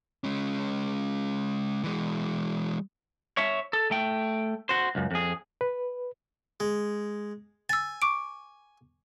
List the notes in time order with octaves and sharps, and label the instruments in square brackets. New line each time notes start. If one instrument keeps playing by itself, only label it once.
[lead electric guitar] G#3 C#4
E3 G#3
C#5 E5
A4
A3 G5
F#4 C5
C#2 F#2
F2 G#4
[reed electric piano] B4
[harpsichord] G#3
[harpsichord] G#5 [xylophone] E6 A6
[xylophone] C#6 D6 D7